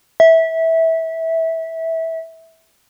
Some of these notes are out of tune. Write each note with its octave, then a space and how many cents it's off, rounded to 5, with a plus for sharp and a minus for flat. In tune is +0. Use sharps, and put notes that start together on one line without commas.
E5 -20